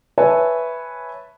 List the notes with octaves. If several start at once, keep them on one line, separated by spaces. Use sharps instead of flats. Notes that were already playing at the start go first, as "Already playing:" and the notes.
B4 C#5 E5 G#5 A5